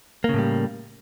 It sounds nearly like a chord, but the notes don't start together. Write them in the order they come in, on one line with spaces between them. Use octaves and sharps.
A#3 C#3 A2 G3